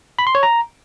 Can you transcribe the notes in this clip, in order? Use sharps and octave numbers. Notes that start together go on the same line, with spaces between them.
B5
C6
C#5
A#5